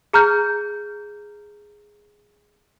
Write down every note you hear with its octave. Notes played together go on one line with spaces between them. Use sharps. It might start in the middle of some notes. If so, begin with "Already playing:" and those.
G#4 A#5 F6 G6